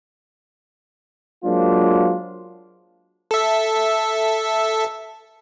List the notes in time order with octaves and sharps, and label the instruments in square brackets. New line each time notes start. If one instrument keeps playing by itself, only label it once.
[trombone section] F#3 G#3 A#3 D4 F4 C5
[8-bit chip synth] A4 E5